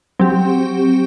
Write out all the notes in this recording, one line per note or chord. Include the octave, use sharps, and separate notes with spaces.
F#3 C4 G4